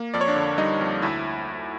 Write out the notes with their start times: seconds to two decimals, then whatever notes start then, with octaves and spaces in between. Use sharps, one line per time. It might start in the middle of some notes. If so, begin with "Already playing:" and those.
Already playing: A#3
0.14 F2 D5
0.21 C#5
0.28 D4 D5
0.36 D3
0.58 G3 D#4 D#5
0.81 F2
1.02 D2 E4 E5